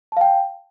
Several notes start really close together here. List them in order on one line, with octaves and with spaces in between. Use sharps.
A5 F5 G5